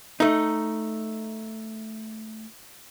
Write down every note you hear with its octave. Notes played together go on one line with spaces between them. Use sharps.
A3 D#4